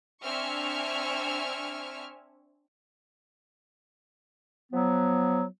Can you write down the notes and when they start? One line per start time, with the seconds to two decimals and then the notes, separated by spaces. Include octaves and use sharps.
0.24 C4 D4 E5 G#5 C#6 F6
4.72 F3 F#3 B3